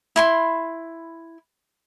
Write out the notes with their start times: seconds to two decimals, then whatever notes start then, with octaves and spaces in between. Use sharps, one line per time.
0.16 E4 B5 C6